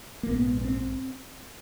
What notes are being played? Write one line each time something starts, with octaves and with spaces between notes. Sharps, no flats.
A#3
A#1 G#2 B3
B3
C4